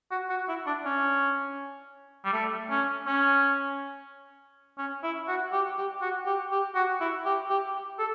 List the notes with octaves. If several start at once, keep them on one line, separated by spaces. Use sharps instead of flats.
F#4
F#4
E4
D4
C#4
G3
A3
C#4
C#4
C#4
E4
F#4
G4
G4
F#4
G4
G4
F#4
E4
G4
G4
A4